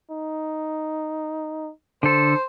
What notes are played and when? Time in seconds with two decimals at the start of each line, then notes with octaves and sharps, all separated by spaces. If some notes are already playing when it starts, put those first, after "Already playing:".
0.11 D#4
2.03 D3 A4 C5